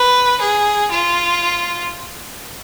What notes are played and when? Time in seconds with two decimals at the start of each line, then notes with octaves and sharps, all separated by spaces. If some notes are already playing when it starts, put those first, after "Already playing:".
Already playing: B4
0.41 G#4
0.91 F4